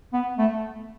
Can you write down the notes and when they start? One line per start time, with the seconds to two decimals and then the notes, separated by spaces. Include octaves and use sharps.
0.13 B3
0.38 A3